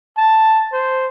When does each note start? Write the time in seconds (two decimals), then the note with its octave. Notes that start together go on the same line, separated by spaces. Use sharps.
0.17 A5
0.73 C5